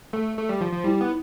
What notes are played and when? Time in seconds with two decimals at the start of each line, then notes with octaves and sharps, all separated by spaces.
0.13 A3
0.37 A3
0.49 G3
0.61 F3
0.73 F3
0.84 G3 E4
1.01 B3